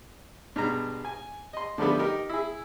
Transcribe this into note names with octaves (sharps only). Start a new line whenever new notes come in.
G2 B2 G#3 A#5
G#5
D#5 C6
D3 F3 G3 A3 B3
D#4 G4 A#4
E4 G#4